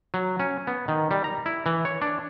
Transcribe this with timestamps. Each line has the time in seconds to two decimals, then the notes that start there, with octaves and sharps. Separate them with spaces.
0.14 F#3
0.40 C#4
0.67 B3
0.88 D#3
1.11 G3
1.24 A#5
1.46 E4
1.66 E3
1.85 C#5
2.02 D4